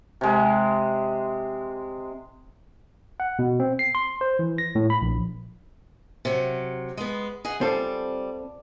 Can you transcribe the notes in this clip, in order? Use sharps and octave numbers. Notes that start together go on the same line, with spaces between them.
C3 G#3
F#5
B2
C4
C7
C6
C5
E3
A#6
A2
B5
A#1
C3 F#3
G#3 B3
G#4 D#5 F#5
G3 C4 F4 A4